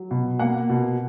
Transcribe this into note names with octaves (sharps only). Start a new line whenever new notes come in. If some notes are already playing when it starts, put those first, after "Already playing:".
Already playing: F#3
B2
A#3 F#5
B2